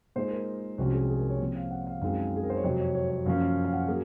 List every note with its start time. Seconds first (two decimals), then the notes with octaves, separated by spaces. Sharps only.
0.16 A#2 G#3 D#4 C5
0.31 A#4
0.78 C2 C3 F3 G#3 C#4 F#4
0.93 G#4
1.09 G#4
1.19 A#4
1.30 C#5
1.40 A#2 F3 C4
1.56 F5
1.71 F#5
1.87 F5
2.01 F#2 D#3 G#3 C4 F5
2.36 G#4
2.43 A#4
2.50 C5
2.57 C#5
2.64 F2 C3 F#3 D#5
2.80 C#5
2.95 C#5
3.11 C#5
3.26 F#2 F3 A#3 C#4 F5
3.42 F5
3.64 F5
3.73 F#5
3.87 F#3 A#3 G#4